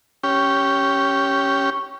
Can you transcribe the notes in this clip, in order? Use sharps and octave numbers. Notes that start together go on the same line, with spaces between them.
C#4 G4